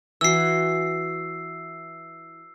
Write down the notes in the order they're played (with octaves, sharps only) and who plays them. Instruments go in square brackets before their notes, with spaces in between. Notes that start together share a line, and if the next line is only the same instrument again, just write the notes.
[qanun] E3 F#4 [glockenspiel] E6 C7